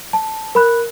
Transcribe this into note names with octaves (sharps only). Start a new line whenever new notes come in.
A5
A#4 B5 F#6